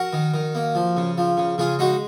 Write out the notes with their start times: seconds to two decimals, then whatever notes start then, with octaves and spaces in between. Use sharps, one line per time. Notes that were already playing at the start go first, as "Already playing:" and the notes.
Already playing: F#4 A#4
0.13 D#3
0.34 D#3
0.55 A#3
0.75 F3
0.97 C#3
1.18 F3
1.37 C#3
1.58 C#3 F4 G#4
1.79 G#3 D#4 F#4